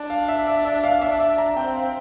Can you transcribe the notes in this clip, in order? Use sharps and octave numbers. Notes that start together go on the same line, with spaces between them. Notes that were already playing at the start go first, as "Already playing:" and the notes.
Already playing: D4 A5
F5
E5
E5
E5
F5
D4 E5
E5
A#5
C4 G5
F5